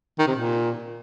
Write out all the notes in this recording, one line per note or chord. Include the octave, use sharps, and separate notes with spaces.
D#3
C3
A#2